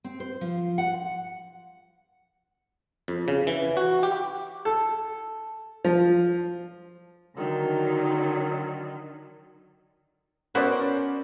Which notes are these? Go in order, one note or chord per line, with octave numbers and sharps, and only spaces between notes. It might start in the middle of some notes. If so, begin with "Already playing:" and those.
C4
C5
F3
F#5
F2
C#3
E3
F#4
G4
A4
F3
D3 D#3 F#3
B3 C#4 E4 F#4 A#4 C5 D5